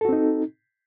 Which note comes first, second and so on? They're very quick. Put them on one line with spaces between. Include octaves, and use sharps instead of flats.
A4 F#4 C4 D#4